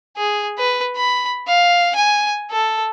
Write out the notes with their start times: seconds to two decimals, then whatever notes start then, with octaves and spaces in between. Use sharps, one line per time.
0.17 G#4
0.58 B4
0.96 B5
1.48 F5
1.95 G#5
2.51 A4